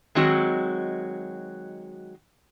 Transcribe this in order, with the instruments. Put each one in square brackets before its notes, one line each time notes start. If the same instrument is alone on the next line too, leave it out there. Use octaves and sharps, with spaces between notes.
[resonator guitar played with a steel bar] D#3 F#3 G#3 C4 F#4